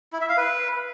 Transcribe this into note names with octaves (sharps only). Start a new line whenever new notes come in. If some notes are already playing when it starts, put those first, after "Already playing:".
E4
E5
F5
B4